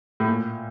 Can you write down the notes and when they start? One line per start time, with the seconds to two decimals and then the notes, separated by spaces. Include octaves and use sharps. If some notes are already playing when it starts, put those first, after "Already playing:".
0.20 A2
0.27 A#2